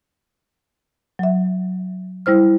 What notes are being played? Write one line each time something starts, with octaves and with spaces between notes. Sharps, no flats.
F#3 E5
G3 E4 C5 F6